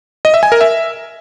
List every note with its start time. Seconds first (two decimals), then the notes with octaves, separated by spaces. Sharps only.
0.25 D#5
0.34 E5
0.43 G#5
0.52 A#4
0.61 E5